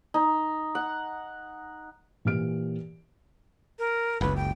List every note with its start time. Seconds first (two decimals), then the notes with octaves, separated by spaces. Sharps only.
0.14 D#4
0.75 F#5
2.25 A#2 E3 G4 F6 D7
3.79 A#4
4.21 F#1 C#2 B4
4.36 G5